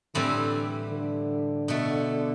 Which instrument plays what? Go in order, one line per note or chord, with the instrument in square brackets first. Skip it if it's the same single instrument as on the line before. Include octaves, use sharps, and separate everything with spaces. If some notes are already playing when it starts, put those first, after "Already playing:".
[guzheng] A2 E3 G3 C4 [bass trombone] D3
[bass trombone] D3
[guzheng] B2 A3